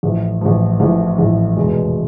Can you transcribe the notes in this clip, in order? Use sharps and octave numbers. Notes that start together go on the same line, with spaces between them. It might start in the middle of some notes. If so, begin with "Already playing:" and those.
A1 A2 F3
A1 A2 F3
A1 A2 F3
A1 A2 F3
F1 E2 B2 G#3